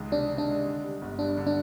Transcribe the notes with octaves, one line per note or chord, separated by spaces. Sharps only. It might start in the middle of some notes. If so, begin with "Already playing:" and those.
Already playing: C#2 D#3 G#3
C3 D4
D#3
D4
G#3
D3
G3
G1
G2 D4
D3
D4